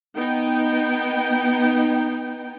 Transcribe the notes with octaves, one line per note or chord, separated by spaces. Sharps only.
B3 D#4 G5